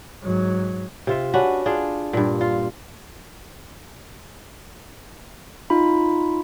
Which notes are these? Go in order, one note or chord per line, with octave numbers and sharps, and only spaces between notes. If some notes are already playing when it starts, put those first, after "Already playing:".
G#2 F#3
C3 F4 E5
C#4 D4 F#4 B4
D4 F4 G#4
G2 A#2
F4
D#4 F4 B5